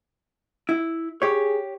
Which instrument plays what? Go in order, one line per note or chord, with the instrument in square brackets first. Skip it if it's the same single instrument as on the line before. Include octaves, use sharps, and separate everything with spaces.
[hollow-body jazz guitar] E4
[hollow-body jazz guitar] G4 C#5 [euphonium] G#4